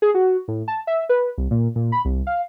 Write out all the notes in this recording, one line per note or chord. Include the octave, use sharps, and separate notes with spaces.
G#4
F#4
A2
A5
E5
B4
C2
A#2
A#2
B5
C2
F5